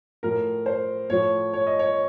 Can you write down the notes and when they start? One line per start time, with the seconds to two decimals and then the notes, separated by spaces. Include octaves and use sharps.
0.23 A2 F3 A#4
0.66 C5
1.10 A2 F3 C#5
1.53 C#5
1.67 D#5
1.79 C#5